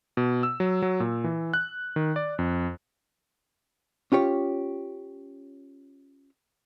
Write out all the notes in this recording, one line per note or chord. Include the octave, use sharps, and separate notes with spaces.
B2
E6
F#3
F#3
A#2
E3
F#6
D#3
D5
F2
C#4 F4 G4 C#5